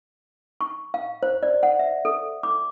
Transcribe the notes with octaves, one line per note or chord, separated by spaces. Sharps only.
C#6
F5
C5
D5
F#5
E5
A4
D6